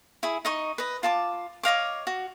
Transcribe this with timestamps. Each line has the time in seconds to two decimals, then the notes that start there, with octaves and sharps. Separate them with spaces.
0.23 E4 G#4
0.45 D#4 D#5 C#6
0.78 B4 D#5
1.03 F4 A5 D6
1.63 C#5 D#5 F5 D6
2.07 F#4